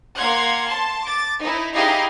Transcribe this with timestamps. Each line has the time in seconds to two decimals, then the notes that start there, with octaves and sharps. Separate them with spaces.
0.16 A#3 F5 F#5 C6 G#6
0.67 A5 C6
1.03 D6 A6
1.40 D#4 E4
1.73 D#4 E4 G4 G#4 D#5 F5